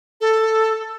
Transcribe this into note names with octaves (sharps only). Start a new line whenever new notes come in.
A4